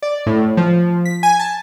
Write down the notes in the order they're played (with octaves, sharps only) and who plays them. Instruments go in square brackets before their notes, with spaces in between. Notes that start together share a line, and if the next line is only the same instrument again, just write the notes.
[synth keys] D5
A2
F3
B6
G#5
A5